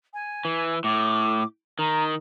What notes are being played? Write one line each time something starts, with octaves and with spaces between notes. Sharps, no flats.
G#5
E3
A2 D6
D#3 A#5